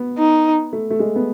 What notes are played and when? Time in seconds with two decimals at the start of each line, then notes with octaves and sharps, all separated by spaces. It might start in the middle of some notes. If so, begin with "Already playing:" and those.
Already playing: B3
0.18 D#4
0.73 A3
0.90 A3
0.99 G#3
1.15 B3